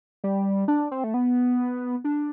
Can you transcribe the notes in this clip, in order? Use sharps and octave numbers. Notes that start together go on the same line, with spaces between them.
G3
D4
C4
A3
B3
D4